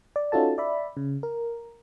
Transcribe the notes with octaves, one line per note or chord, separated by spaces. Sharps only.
D5
C#4 D#4 F4 F#4 A4 A5
D5 E5 B5
C#3
A#4